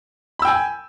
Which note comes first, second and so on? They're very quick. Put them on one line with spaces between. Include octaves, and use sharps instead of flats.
B5 E6 G5 G#5